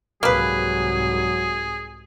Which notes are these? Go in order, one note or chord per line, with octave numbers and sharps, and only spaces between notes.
C2 G#2 F#3 A#3 G#4 B4